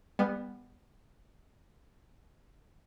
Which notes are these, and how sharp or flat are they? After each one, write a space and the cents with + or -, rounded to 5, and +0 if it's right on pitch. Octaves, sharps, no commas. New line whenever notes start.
G3 +35 B3 +0